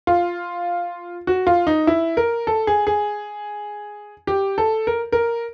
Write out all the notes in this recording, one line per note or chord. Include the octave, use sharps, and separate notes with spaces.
F4
F#4
F4
D#4
E4
A#4
A4
G#4
G#4
G4
A4
A#4
A#4